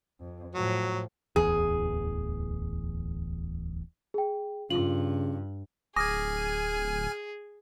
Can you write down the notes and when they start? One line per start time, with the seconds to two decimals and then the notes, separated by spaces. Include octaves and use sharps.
0.20 F2
0.55 A2 F3 F#3
1.36 D1 A1 E2 G#4
4.14 G#4 G5
4.70 G2 C#3 F4 F#7
5.96 D1 G#4 G#5 D6 D#6 F6 G#6 A#6